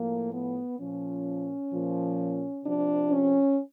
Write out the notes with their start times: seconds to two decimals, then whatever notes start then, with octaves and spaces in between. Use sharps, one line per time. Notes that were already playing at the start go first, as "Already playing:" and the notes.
Already playing: A2 F3 A#3
0.33 B3
0.79 A#2 F3 C#4
1.72 A#2 F3
2.64 C3 F3 D4
3.11 C#4